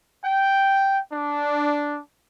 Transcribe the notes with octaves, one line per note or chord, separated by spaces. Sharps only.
G5
D4